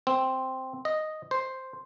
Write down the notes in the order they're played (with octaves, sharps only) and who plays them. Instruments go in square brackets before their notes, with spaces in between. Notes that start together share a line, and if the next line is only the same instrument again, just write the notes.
[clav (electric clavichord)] C4
D#5
C5